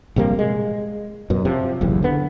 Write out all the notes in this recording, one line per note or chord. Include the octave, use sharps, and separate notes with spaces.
A#1 C3 G3 A#3
G#3
F#2 B2
C3 F3
F#1 B1 E2
D3 B3